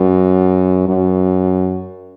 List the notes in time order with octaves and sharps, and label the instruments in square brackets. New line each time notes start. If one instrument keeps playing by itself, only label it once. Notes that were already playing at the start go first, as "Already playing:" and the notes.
Already playing: [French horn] F#2
F#2